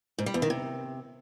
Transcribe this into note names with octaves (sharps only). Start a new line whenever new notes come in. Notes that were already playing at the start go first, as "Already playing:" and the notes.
G#2
G3
E2
D#3
C3